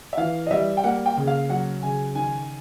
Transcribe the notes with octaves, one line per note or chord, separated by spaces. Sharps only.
E5
E3 F5
D#5
G3 E5
G5
A#3 F#5
G5
C#3
F5
F#3 F#5
C#3 G#5
D#3 G#5